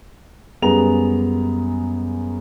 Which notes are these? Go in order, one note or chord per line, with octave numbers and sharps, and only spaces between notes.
F#2 G3 B3 G#4 A#5 F7